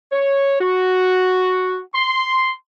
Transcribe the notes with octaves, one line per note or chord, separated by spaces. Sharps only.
C#5
F#4
C6